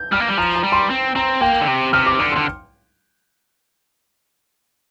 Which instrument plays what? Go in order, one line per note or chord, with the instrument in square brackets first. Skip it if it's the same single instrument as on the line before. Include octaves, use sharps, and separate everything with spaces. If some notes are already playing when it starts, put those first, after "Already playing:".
Already playing: [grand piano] G6
[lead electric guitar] G3 [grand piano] F6
[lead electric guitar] A#3
G3
[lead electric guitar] F3 [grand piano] A#5
[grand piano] A#5
[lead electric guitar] G3
[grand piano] C6
[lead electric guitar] C4
[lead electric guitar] C4 [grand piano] A#5
[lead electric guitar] A#3 [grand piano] G5
[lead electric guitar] D3
C3
[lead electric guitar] C3 [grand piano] F6
[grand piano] D6
[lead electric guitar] D3 [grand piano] D6
[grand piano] C6
[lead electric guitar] D3